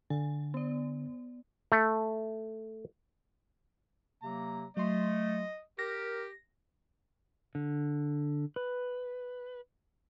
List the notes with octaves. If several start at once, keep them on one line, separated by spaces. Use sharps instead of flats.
D3 G#5
B3 D5
A3
C3 F#3 A#3 A#5
F#3 A3 D#5 C6
G4 A#4 A#6
D3
B4